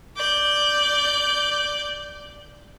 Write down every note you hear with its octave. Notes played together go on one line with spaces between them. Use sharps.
D5 G6